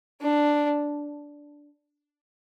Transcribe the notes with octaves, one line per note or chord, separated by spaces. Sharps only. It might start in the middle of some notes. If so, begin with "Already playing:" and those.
D4